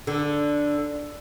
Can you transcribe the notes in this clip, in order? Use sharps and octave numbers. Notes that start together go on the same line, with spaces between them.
D3